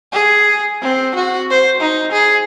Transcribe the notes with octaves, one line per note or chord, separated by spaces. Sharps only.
G#4
C4
F#4
C5
D#4
G#4